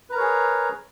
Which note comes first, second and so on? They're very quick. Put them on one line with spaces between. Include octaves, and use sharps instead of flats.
B4 A#5 A#4 C#5 G#4